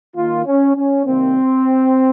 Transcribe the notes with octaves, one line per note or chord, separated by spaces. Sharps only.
D#3 A#3 F4
C#4
C#4
C3 D#3 G3 A#3 C4